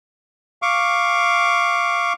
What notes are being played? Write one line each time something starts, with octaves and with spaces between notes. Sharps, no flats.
F5 C#6 D6